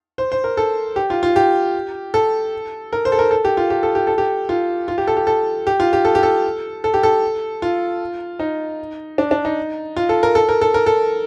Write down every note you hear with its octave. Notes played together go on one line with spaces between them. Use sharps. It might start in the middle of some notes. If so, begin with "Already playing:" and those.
C5
C5
A#4
A4
G4
F4
F4
G4
A4
A#4
C5
A4
A#4
A4
G4
F4
G4
A4
G4
A4
G4
F4
F4
G4
A4
G4
A4
G4
F4
G4
A4
G4
A4
A4
G4
A4
F4
D#4
D4
D4
D#4
F4
A4
A#4
A4
A#4
A4
A#4
A4